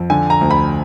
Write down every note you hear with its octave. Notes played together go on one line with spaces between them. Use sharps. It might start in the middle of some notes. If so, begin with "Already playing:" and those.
Already playing: F2
D3 G#5
A#5
D2
B5